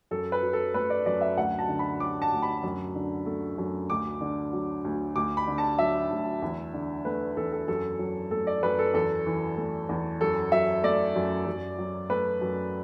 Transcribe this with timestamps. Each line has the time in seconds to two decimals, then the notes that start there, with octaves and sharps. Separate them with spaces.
0.11 F#2 A4
0.32 B4
0.43 F#3
0.53 A4
0.74 A3 B4
0.90 D5
1.06 F#2 D5
1.21 E5
1.37 D2 F#5
1.59 A5
1.69 D3
1.79 B5
2.00 F#3 D6
2.22 A5
2.32 D2
2.42 B5
2.63 F#2
2.95 D3
3.26 A3
3.58 F#2
3.90 D2 D6
4.21 D3
4.53 F#3
4.84 D2
5.16 D2 D6
5.37 B5
5.47 D3
5.58 A5
5.79 F#3 E5
6.11 D2
6.42 E2
6.73 D3
7.05 A3 B4
7.37 E2 A4
7.52 A4
7.68 F#2 A4
7.99 F#3
8.31 A3 A4
8.47 D5
8.63 F#2 B4
8.79 A4
8.94 E2 A4
9.26 E3
9.57 A3
9.89 E2
10.21 F#2 A4
10.52 F#3 E5
10.83 A3 D5
11.15 F#2
11.47 F#2
11.78 F#3
12.10 A3 B4
12.41 F#2